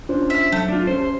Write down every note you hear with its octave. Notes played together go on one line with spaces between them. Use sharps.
C#4 D4 F4 C5
E5
F#3 A3
D4 F4
C#4 C5
G4